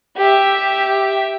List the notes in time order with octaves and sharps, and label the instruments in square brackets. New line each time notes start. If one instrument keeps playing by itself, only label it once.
[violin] G4 E5